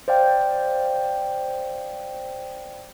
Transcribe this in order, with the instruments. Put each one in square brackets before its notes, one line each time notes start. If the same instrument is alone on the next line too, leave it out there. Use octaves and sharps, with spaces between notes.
[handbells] C5 D5 F5 G5